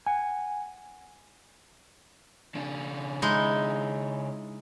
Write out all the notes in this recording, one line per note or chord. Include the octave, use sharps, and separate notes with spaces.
F#5 G#5
C#3 D4
G#3 D#4 E4